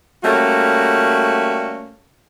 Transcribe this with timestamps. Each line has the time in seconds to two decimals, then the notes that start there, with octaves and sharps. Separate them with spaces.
0.23 G3 A3 A#3 C#4 F#4